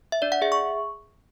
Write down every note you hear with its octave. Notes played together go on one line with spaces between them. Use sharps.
E5
D4 D5
F#5
G#4 E5
C#6